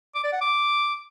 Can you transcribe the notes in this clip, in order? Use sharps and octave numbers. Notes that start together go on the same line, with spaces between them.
D6
D5
F#5
D6